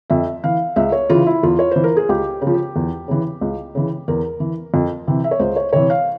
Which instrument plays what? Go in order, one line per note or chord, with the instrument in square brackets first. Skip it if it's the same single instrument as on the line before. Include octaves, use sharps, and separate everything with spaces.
[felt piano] F2 E5
E3 F5
C#2 E5
C#5
C#3 E3 F4
E4
E2 F4
C#5
E3 C5
A#4
G#4
C#2 G4
C#3
F3
E2
C#3 E3
C#2
C#3 E3
E2 A#4
E3
F2
C3 E3
E5
C#5
C#2 C5
C#5
C3 E3 C#5
F5